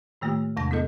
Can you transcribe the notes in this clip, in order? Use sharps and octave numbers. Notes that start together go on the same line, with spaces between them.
A2 D#3 A3 A#3 F4 G4
E2 C3 G#3 D4 A5 A#6
B3 E4 G#4 A4 D#5